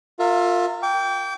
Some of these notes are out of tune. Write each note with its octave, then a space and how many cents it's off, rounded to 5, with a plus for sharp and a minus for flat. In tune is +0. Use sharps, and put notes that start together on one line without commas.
F4 +20 A#4 -30 E5 +0
G5 +0 D6 -35